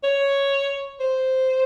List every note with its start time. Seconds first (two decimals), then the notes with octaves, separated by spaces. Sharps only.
0.04 C#5
1.00 C5